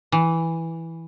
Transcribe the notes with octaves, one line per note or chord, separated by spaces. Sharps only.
E3